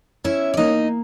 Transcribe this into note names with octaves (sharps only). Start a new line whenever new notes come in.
C#4 E4 E5
D5
A#3 D#4 D#5